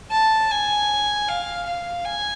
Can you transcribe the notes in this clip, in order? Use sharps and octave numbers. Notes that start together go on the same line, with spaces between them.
A5
G#5
F5
F5
G#5